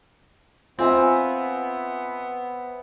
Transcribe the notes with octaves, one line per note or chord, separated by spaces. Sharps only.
B3 C4 F4 E5 G#5 A#5 E6